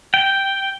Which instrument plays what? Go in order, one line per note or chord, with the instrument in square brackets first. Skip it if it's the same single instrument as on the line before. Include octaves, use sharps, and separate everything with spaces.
[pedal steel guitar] G5